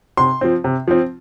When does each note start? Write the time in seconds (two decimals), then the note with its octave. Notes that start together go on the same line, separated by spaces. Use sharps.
0.17 C3 C6
0.41 F3 C4
0.64 C3
0.88 F3 C4